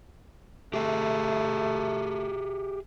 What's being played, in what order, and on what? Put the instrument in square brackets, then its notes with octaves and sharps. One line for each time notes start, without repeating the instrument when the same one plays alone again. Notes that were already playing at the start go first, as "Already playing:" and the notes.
[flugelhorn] A3 [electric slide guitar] G4 G#4 E5